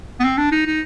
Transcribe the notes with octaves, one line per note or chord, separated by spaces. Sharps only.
B3
C4
D4
D#4
D#4